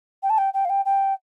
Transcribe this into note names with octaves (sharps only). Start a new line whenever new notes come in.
G5
A5
G5
G5
F5
G5
G5